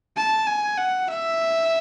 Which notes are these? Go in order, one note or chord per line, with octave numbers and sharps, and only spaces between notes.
A5
G#5
F#5
E5